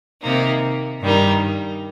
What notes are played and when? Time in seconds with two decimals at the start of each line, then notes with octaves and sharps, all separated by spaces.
0.22 C3 D#3 A#3 D#4
1.01 G2 D#3 G3 D#4